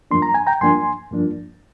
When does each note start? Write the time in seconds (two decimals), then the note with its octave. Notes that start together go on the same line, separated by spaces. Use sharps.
0.11 G2 F3 A#3 D4 C6
0.22 A#5
0.34 G#5
0.47 G5 A#5
0.61 G2 F3 A#3 D4 G#5 C6
1.11 G2 F3 A#3 D4